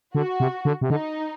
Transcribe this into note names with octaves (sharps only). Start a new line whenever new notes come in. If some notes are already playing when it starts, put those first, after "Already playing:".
D3 F#4
C3
D3
C3
D3 D#4